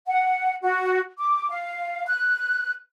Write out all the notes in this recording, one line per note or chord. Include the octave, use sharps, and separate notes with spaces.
F#5
F#4
D6
F5
F#6